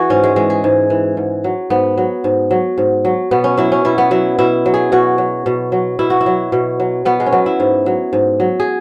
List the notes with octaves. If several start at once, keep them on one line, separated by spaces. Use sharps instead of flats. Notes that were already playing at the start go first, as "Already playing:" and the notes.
Already playing: E3 F#4 G#4
G#2 C#4
G#3
E3 G#3
G#4
G#2
E3
G#2
F#3
G#2 B3
F#3
G#2
F#3
G#2
F#3
B2 B3
C#4
F#3 E4
C#4
B2 E4
B3
F#3 E4
B2 E4
F#3
G#4
B2 F#4
F#3
B2
F#3
B2 E4
F#4
E4
F#3
B2
F#3
B2 B3
G#3
C#4
F#3 B3
E4
G#2
F#3
G#2
F#3
G#4